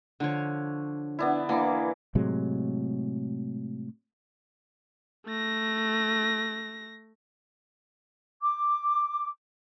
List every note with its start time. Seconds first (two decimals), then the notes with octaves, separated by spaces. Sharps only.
0.20 D3 F3 C#5
1.19 B3 D4 E4
1.49 E3 A#3 D6
2.15 A2 C3 F#3 G#3
5.26 A3 A#6
8.42 D6